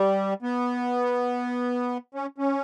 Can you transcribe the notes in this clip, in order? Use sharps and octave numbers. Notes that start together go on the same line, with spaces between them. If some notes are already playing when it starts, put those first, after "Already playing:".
Already playing: G3
B3
C#4
C#4